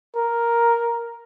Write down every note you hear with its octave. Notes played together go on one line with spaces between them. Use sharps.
A#4